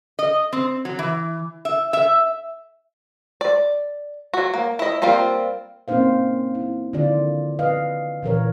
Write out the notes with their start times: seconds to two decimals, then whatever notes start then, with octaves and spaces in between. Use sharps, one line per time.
0.19 D#5
0.53 C4
0.85 F#3
0.99 E3
1.65 E5
1.93 E5
3.41 D5
4.34 F#3 F#4
4.54 A#3
4.79 E4 D#5
5.02 G3 A#3 C4 F4
5.88 A#3 C4 C#4 D#4 C5 F5
6.55 E4
6.93 D3 D#3 E4 F4 D5
7.59 B4 D#5 F5
8.23 A#2 E3 A#4 C#5